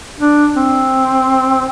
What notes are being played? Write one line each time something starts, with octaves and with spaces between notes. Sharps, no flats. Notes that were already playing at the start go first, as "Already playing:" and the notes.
D4
C4